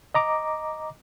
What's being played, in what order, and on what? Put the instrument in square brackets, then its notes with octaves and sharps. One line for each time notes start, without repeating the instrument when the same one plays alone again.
[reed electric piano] D#5 A#5 D6